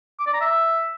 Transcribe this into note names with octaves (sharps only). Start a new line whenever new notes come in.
D6
D5
A#5
E5